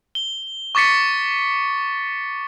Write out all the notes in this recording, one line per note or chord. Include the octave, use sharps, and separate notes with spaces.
G7
C#6 D6 A6 B6 C#7